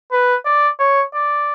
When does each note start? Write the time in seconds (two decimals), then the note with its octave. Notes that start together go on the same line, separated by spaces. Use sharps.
0.12 B4
0.45 D5
0.80 C#5
1.14 D5